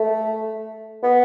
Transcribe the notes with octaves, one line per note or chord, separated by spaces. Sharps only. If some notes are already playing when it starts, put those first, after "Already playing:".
Already playing: A3
B3